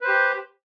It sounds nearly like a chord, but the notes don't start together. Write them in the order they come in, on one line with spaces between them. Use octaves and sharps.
B4 C5 G4